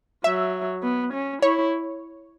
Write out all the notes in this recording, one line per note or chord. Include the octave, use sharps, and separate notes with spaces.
F#3 E5
B3
C#4
E4 C#5